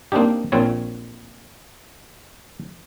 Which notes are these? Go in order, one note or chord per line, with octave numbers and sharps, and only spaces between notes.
A#3 C4 D4 D#4 G4
A#1 A#2 C4 C#5